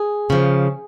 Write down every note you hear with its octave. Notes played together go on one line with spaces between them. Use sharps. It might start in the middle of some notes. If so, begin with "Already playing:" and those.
Already playing: G#4
C#3 F3